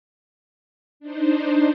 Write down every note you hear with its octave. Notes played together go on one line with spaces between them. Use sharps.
D4 D#4 C5